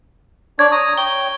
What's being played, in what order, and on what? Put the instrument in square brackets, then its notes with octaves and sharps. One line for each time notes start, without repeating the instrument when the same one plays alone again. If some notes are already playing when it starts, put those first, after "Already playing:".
[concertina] D4 C#5 D5 [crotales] G#6
[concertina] A#5 D#6
[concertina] C#5 G5 [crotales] G7